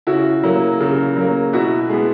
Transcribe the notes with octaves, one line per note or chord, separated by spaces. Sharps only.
C#3 E4 F#4
F#3 A#3
C#3
F#3 A#3
B2 E4 F#4
G#3 B3